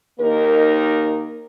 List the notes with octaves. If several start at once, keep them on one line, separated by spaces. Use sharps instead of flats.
D#2 A#3 D#4 A#4